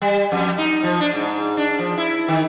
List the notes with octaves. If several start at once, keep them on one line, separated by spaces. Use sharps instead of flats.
G3
F2
D#4
F3
D4
G#2
D4
F3
E4
D#3